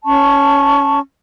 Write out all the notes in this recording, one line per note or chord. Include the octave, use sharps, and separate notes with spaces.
C#4 A5 C#6